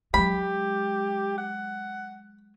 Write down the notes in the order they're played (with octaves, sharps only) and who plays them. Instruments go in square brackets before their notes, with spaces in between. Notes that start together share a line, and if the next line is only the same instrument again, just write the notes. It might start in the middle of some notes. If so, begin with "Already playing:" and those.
[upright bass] F#3 G#3 [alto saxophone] G4 [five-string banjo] B5
[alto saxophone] F#5